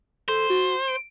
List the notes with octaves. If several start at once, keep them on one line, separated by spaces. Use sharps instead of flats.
A4 C5
F#4
D7